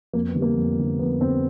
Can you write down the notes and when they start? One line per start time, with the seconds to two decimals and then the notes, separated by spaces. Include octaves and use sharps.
0.13 F2 A#3
0.28 B3
0.35 D3 G3
0.42 A#3
0.56 F2
0.78 D3 G3
0.99 F2 B3
1.21 D3 G3 C4